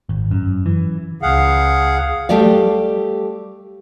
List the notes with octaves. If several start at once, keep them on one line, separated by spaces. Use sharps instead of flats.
G#1
F#2
E3
C#2 G#4 F5 F#5
G3 A3 G4 D5 F5